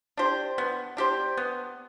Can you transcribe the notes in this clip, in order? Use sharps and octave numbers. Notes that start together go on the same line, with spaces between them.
D4 G4 C5
B3
D4 G4 C5
B3